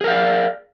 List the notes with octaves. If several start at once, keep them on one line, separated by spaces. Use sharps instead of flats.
G#4 A#4 D5 F5